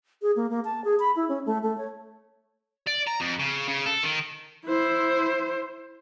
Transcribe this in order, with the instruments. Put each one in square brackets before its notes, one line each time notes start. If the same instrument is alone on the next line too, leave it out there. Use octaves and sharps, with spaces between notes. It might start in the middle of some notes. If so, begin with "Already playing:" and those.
[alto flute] G#4
A#3
A#3
A5
G#4
B5
E4
C#4
A3
A3
C#5
[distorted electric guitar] D5
A#5
F2
C#3
C#3
A4
D#3
[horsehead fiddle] E4 C5